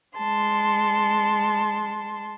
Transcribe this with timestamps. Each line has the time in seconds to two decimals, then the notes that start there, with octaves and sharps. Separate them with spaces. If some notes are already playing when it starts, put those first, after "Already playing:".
0.17 G#3 A5 C6